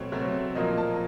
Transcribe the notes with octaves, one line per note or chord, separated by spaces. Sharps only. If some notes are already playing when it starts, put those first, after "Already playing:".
Already playing: B2 F#3 A3 C4 C#5
B2 F#3 A3 C4
A#2 F3 A#3 D#5
A5